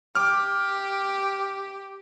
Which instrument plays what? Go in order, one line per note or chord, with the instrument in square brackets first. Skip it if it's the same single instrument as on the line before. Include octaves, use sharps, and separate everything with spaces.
[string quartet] G4 [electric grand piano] D6 F6